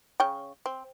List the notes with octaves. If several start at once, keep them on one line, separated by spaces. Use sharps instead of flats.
C#3 C#5 G5
C4